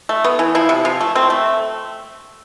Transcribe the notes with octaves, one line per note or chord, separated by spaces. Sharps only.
A3
B3
E3
F3 E4
C3
F3
A3
A3 C4
A3